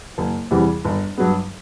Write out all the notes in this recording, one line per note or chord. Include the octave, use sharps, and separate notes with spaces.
F#1
E2 C3 E3 G3
G1
G2 F#3 B3